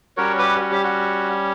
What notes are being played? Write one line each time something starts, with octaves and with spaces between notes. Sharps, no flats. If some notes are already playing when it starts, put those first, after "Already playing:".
G3 C#4 F#4 A#4 C#5
G4 B4
F#4
G4
F#4